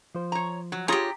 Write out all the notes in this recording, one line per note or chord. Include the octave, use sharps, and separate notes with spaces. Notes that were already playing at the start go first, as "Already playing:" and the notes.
F3 C5
C#5 A#5
F#3
F4 G4 G#4 C#5 A#5